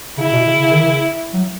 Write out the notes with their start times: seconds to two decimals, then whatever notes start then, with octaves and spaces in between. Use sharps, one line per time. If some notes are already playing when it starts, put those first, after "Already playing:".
0.18 C#3 E4
0.32 B2
0.47 C#3
0.61 C#3
0.72 D#3
0.81 C#3
1.33 F#3